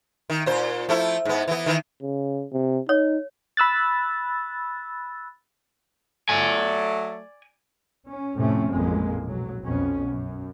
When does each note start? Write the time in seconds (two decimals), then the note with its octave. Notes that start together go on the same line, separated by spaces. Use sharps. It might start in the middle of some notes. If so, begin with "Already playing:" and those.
0.30 D#3
0.46 A#2 C5
0.89 F3 A3 E4
1.25 G#2 B3
1.48 E3 B3
1.66 D#3 E3
2.02 C#3
2.52 C3
2.89 D#4 C#5
3.57 B5 E6 F#6 A6
6.29 F#3 A3 D5 G#5
8.07 C#4
8.38 F2 A2 C3 A3 C4 C#4
8.71 A1 F2 A#2 G#3 A#3
9.26 B1 F#3
9.65 B1 F2 B2 C#4
10.11 F#2